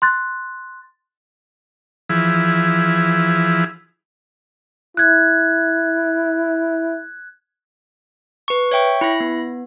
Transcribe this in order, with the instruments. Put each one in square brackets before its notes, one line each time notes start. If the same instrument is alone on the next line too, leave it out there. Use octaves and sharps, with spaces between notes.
[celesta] C6 F#6 A6
[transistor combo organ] E3 F3 E4 G#4
[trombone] E4 [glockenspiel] F#6 G#6
[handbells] B4 C#6
C#5 E5 G5 C#6
E4 B5 A#6
B3